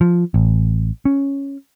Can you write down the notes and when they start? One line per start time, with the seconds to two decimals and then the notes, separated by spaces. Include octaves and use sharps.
0.01 F3
0.34 A1
1.05 C#4